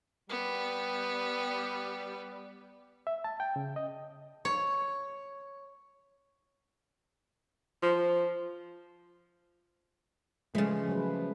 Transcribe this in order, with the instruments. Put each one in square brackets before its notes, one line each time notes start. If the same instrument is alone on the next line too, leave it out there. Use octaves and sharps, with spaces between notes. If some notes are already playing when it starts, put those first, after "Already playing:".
[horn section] G3 [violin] B3
[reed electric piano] E5
A5
G5
C#3
D#5
[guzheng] C#5
[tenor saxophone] F3
[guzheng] C#3 E3 [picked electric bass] F3 [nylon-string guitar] G#3 [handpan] A3
[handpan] F#3 B4